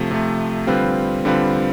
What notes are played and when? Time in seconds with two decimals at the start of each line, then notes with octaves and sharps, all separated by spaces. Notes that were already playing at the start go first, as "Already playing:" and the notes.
Already playing: C3 F3 A3
0.11 C3 F3 A3
0.67 D3 G3 C4 F4 B4
1.25 D3 G3 C4 F4 B4